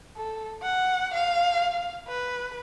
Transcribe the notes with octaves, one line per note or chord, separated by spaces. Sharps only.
A4
F#5
F5
B4